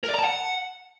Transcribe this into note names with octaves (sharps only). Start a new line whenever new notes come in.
A#4
D5
A#5
A5
F#5